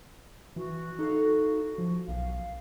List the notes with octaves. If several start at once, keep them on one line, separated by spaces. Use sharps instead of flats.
E3 F#4
D#4 A4 F5
F3
B1 F#2 F5